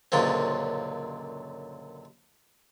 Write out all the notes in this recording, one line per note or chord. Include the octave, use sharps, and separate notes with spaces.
C#2 F#2 A#2 D3 F3 C4